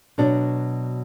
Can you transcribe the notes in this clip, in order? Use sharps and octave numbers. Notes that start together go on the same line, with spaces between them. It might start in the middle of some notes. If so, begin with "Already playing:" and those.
B2 F#3 D4